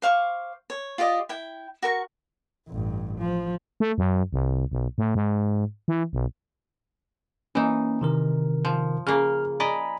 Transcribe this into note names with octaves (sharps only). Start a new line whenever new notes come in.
C5 F5 C#6 D6
C#5
F4 G4 D5 D#5
E4 G5
F#4 A#4 C#6
A1 G2
F3
A3
F#2
C2
B1
A2
G#2
E3
B1
E3 A#3 C#4 D#4
C3 D#3 A#4
F3
C#3 A#3 F6
D5 D#5 G#5 A#5 B5